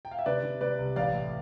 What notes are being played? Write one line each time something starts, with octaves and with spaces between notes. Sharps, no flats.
G5
F5
E5
C3 B4 D5
C3
C3 B4 D5
C2
A1 D5 F5
A2